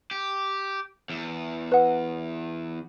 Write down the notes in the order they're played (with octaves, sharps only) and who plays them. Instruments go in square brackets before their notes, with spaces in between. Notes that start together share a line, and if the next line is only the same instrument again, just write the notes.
[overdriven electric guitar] G4
E2
[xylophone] B4 F#5